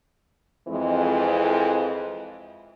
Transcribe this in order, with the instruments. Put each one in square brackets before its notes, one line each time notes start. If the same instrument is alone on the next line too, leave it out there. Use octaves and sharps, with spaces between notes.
[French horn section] F2 E3 G#3